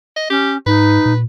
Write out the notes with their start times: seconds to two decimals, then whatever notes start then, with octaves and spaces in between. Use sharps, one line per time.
0.16 D#5
0.30 C#4 G4
0.66 G#2 D#4 B4
1.06 A#2